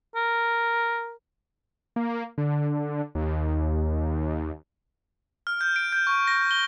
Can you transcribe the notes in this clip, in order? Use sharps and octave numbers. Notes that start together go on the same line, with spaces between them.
A#4
A#3
D3
D#2
F6
G6
D7
G6
C#6
A#6
G7